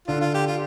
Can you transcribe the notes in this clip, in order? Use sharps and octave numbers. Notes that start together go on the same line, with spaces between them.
D3 D4 F4
F4
G4
F4